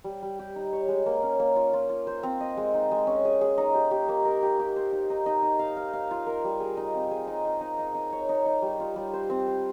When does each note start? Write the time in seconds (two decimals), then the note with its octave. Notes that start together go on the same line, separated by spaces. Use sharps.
0.04 G3
0.22 G3
0.39 G4
0.56 D#4
0.73 C#5
0.88 G#3
1.06 A#3
1.22 C#4
1.40 A#3
1.56 F4
1.73 F4
1.89 F4
2.07 C5
2.23 C4
2.41 D#5
2.57 G#3
2.74 D#4
2.91 G#3
3.07 C#4
3.25 G#4
3.41 G#4
3.58 D#4
3.74 G4
3.91 G4
4.09 A#3
4.25 A#4
4.43 G4
4.60 G4
4.76 C5
4.92 D#4
5.10 D#4
5.26 D#4
5.42 D#4
5.59 F5
5.76 F5
5.93 F5
6.11 F4
6.27 A#4
6.45 G3
6.60 G#4
6.77 D#4
6.94 C4
7.11 G#4
7.28 D#4
7.45 D#4
7.61 D#4
7.79 D#4
7.95 D#4
8.12 C#5
8.29 D#4
8.46 D#4
8.62 G3
8.80 F4
8.96 G3
9.14 C5
9.30 C4
9.47 C5